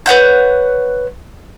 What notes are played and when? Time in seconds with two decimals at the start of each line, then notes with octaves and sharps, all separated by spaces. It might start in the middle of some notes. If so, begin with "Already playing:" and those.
0.06 B4 C#5 F#5 G6